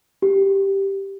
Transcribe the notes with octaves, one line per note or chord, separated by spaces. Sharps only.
G4